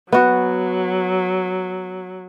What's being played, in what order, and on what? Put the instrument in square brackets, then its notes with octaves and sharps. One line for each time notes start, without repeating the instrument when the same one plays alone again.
[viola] F#3 [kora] B3 F#4